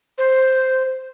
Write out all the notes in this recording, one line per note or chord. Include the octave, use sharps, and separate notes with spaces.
C5